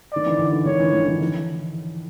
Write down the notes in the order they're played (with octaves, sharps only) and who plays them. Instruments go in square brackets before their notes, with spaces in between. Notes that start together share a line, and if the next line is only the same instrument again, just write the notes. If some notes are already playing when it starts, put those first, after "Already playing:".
[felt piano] D#3 [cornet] D5
[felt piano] D3 E3
D3 E3
D#3
[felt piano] D#3 [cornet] C#5
[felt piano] D3 E3
D3 E3
D#3 F3
D3 E3